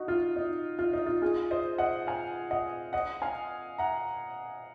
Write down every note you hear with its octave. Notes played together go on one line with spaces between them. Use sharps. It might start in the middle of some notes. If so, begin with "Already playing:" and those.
Already playing: D#4 F#4
F4
D#4
F4
D#4
F4
F4 G#4
C5 D#5
D#5 F#5
F5 G#5
D#5 F#5
D#5 F#5
F5 G#5
F#5 A#5